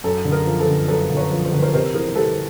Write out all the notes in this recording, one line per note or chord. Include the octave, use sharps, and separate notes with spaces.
F#2 A4
D3
G#4 A#4
F3
A4 B4
G1
F#2 A4 B4
D3
B4 C#5
F3
C5
G1 B4
A#4 C5
C3 A#4 C5
E3 G#4 A#4
G3 A4 B4